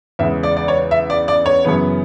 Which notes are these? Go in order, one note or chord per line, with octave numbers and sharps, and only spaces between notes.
E2 C#3 G#3 E5
D5
D5
C#5
E5
D5
D5
C#5
F#2 C#3 E3 B3